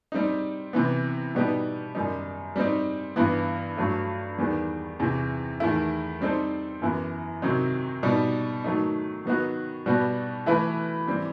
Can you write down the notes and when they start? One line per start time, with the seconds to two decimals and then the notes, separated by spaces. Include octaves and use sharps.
0.12 G3 C4 D#4
0.73 C3 E3 B3
1.34 B2 G3 B3 D#4 G4
1.95 F#2 D#3 G3 D#4
2.56 G3 C4 D#4
3.16 G2 E3 B3 E4
3.77 G2 F#3 A3
4.38 E2 D#3 G3 B3
4.99 E2 C3 E3
5.60 E2 D#3 A3 E4
6.21 G3 C4 D#4 A4 C5
6.81 F#2 E3 B3 E4
7.42 C3 D#3 F#3 C4 D#4
8.03 B2 G3 D#4
8.64 D#3 F#3 A3 D#4
9.25 D#3 F#3 B3 D#4 F#4
9.86 B2 G3 B3 F#4
10.46 E3 A3 E4 B4
11.08 E3 G3 C4